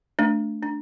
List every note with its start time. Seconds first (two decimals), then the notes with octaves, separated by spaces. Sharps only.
0.19 A3 D4
0.63 D4